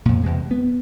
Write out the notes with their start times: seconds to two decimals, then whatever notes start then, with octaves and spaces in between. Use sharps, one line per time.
0.06 F2 A#2
0.23 E2 C3 G#3
0.51 B3